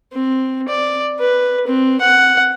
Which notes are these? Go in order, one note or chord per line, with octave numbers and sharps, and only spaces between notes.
C4
D5
B4
C4
F#5